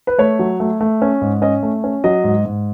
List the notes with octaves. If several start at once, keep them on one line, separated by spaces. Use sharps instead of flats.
B4
A3 C#5
F#3
A3
A3
C#4
G#2
C#4 D#5
A3
C#4
F#3 D#5
G#2
G#2